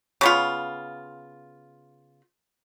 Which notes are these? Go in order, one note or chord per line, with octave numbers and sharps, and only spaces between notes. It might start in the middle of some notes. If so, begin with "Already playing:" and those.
C#3 B3 F4